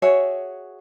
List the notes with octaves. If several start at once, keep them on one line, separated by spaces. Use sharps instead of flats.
F#4 G#4 C#5 E5